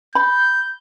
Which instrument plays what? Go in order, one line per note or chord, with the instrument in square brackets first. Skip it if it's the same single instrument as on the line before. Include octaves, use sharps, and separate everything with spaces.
[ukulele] B5 [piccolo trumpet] G6